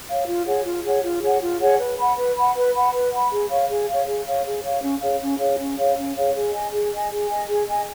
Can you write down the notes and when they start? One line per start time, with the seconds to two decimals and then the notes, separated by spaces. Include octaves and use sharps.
0.09 C#5 F5
0.27 F4
0.46 G#4 C#5 F#5
0.65 F4
0.84 G#4 C#5 F#5
1.04 F4
1.23 G#4 C#5 F#5
1.41 F4
1.60 G#4 C#5 F#5
1.80 B4
1.99 F#5 B5
2.17 B4
2.36 F#5 B5
2.56 B4
2.74 F#5 B5
2.93 B4
3.12 F#5 B5
3.31 G#4
3.49 C#5 F5
3.70 G#4
3.88 C#5 F5
4.07 G#4
4.26 C#5 F5
4.45 G#4
4.63 C#5 F5
4.82 C#4
5.01 G#4 C#5 F5
5.21 C#4
5.39 G#4 C#5 F5
5.59 C#4
5.77 G#4 C#5 F5
5.96 C#4
6.15 G#4 C#5 F5
6.35 G#4
6.53 D#5 G#5
6.72 G#4
6.92 D#5 G#5
7.10 G#4
7.29 D#5 G#5
7.49 G#4
7.68 D#5 G#5